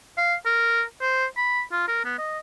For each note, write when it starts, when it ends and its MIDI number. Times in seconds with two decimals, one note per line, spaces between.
0.17 0.34 77
0.45 0.82 70
1.01 1.25 72
1.37 1.62 83
1.72 1.88 65
1.88 2.03 70
2.05 2.17 59
2.19 2.38 75